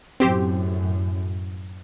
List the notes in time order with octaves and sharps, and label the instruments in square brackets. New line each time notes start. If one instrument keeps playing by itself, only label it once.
[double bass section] F#2 A2 [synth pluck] C4 G4 C5